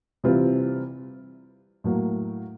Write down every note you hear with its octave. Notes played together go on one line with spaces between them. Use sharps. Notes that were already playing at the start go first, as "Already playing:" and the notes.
C3 E3 G3 C4 F4
A2 F#3 A#3